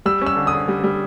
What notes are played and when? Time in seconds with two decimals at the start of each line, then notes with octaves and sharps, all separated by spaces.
0.06 G3 E6
0.22 C#4 E6
0.36 D3
0.47 D#6
0.53 D3
0.68 G3
0.84 G3